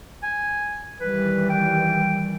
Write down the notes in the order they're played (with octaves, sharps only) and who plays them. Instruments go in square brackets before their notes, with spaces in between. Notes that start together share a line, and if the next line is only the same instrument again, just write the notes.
[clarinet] G#5
[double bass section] D#3 E3 G3 [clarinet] B4
[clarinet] G5